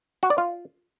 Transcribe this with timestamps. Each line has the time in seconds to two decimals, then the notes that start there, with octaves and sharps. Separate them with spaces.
0.23 F#4
0.30 D5
0.38 F4